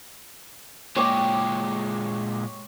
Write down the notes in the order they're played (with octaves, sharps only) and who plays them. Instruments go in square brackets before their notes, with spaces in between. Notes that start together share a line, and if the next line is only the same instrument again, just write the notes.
[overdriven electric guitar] A#2 G#3 [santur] C#5 G5 D6